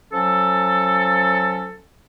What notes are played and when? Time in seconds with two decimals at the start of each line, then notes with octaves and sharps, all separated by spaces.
0.13 F3 F#3 C#4 A4